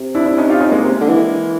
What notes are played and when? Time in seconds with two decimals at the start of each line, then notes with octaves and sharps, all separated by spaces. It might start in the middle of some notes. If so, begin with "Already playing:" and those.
Already playing: C3
0.15 D4 E4
0.26 D4 E4
0.38 C#4 D#4
0.49 F4 G4
0.60 C#4 D#4
0.72 G#3 A#3
0.84 C3
1.01 D3
1.09 E3